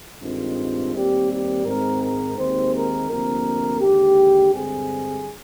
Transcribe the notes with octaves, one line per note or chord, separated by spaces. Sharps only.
G2 D#3 G#3 C4 F4
D#2 D#3 G3 C4 G4
G4
G#2 D#3 G#3 C4 A#4
A#4
D#2 D#3 G#3 C4 C5
A#4
D2 C3 F3 A#3 A#4
D#2 D3 G#3 G4
G2 D3 G#3 C4 G#4